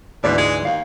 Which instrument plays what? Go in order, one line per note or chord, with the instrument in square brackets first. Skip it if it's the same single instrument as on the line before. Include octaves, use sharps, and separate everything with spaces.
[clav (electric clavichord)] D2 G#2 E3 [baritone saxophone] B2 [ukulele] D5
[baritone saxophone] G#3
[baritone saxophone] D#2 [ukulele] F5